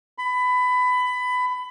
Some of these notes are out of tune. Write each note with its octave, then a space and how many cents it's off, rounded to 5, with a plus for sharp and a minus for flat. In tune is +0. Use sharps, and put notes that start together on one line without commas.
B5 +20